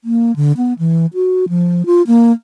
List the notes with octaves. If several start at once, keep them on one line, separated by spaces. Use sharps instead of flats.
A#3
D3
B3
E3
F#4
F3
F4
A#3